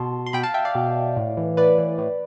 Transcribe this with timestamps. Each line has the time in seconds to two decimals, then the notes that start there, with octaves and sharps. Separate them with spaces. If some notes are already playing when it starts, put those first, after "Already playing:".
Already playing: B2 A5 C6
0.26 C6
0.33 B2 G5 B5
0.43 F5 A5
0.54 E5 G5
0.65 D5 F5
0.75 B2
1.17 A2
1.37 E3
1.57 A2 B4 D5
1.78 E3
1.98 A2